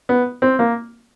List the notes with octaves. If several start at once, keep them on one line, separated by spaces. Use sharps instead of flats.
B3
C4
A#3